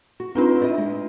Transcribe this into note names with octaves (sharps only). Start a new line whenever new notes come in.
F#4
C4 D4 D#4 F4 B4 C5
E4 D5 D#5
G#3